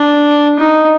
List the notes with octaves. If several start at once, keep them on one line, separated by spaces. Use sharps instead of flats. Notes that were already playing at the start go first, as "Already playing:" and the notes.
Already playing: D4
D#4